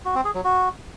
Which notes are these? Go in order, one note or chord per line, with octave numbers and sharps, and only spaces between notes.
F#4
C4
G#4
F#3
F#4